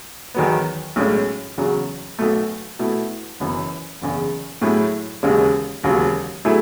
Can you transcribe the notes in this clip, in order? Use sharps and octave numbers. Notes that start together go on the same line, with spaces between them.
E2 D#3 F#3 B3
B1 A2 G#3 C#4
E2 C#3 F#3
B1 B2 A3
B2 A3 E4
F#1 F#2 E3
F#1 E2 C#3
A2 F#3 A3 E4 G#4
E1 D#2 C#3 G#3 C#4
E1 D#2 C#3 F#3
B2 F#3 A3 E4 G#4